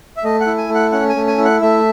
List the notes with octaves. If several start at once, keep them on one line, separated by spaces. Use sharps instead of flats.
E5
A3 D#5
F#5
E4
G#5
A3
F#5
C#4 F#5
G#5
A3
G#5
E4
F#5
A3 E5